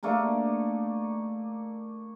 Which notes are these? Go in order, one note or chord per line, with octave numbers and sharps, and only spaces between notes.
A3 A#3 D4 D#4